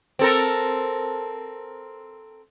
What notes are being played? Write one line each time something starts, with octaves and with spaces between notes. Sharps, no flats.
C4 A4 A#4